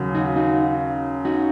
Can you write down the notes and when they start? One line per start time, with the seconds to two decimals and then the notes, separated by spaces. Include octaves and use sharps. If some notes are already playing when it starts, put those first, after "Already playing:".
Already playing: D#2 C#3 F#3
0.15 D#4 F#4
0.36 D#4 F#4
1.25 D#4 F#4